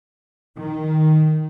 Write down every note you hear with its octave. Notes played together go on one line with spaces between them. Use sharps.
D#3